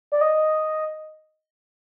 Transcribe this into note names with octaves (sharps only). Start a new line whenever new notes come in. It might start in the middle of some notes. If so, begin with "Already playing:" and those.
D5
D#5